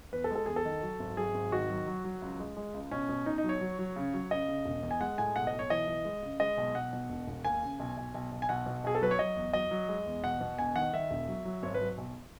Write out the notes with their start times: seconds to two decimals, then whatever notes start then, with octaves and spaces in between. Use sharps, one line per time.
0.13 E2 B4
0.24 A4
0.30 G#3
0.35 A4
0.46 E2 G#4
0.56 A4
0.65 D#3
0.82 F#3
1.00 G#1
1.17 F#3 G#4
1.34 G#1
1.52 D#3 F#4
1.70 F#3
1.87 F#3
2.05 F#3
2.22 C#2
2.40 G#3
2.57 G#3
2.74 C#2
2.91 B2 C#4
3.09 B2
3.26 B2 D#4
3.38 D#4
3.44 F#3
3.49 C#5
3.61 F#3
3.79 F#3
3.96 C#3
4.14 F#3
4.31 C#3 D#5
4.48 C#3
4.65 E1
4.83 E2
4.91 G#5
5.00 G#3 F#5
5.18 A2 G#5
5.35 B1 F#5
5.47 D#5
5.53 B1
5.59 C#5
5.70 E3 D#5
5.88 E3
6.05 G#3
6.22 C#3
6.40 G#3 D#5
6.58 B1
6.75 B1 F#5
6.93 B2
7.10 E1
7.27 E1
7.44 D#2 G#5
7.62 C#3
7.80 B1
7.97 B1
8.14 B1
8.32 B1
8.42 G#5
8.49 B1 F#5
8.66 B2
8.84 B1 G#4
8.95 A4
9.01 F#3 B4
9.11 C#5
9.19 F#3 D#5
9.36 E2
9.53 F#3 D#5
9.71 F#3
9.89 G#3
10.06 E2
10.24 B2 F#5
10.41 B2
10.58 E1 G#5
10.76 D#3 F#5
10.93 D#3 E5
11.11 E1
11.28 F#3
11.45 F#3
11.63 G#1 C#5
11.74 B4
11.81 F#3
11.98 B1